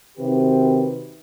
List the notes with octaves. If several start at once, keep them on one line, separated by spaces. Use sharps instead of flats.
C3 D#3 C4 F#4 G4 B4